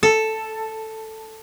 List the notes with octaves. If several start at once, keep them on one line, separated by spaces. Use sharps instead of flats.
A4